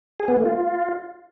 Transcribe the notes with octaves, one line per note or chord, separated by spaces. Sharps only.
G#4
B3
A3
F4